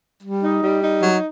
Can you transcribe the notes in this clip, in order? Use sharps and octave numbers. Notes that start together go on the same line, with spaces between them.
G3
D#4
G3
D#4
F#3